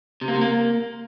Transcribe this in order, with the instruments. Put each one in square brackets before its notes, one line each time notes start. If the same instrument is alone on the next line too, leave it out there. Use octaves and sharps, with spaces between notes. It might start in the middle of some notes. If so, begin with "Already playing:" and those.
[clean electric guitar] C3
A#3
C3
A#3